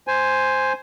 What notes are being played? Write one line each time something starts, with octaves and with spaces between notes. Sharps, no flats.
C5 G#5